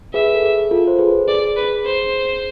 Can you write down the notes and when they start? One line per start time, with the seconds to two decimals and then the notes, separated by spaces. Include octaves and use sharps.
0.13 G#4 B4 E5
0.35 A4
0.42 G#4
0.71 F4 A4
0.88 C5
0.99 G#4 B4
1.28 G#4 D5
1.57 B4
1.85 C5